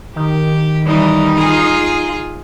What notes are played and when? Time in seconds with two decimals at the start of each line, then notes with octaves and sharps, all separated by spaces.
0.16 D#3 G4
0.86 E3 G3 D#4
1.37 F4 G#4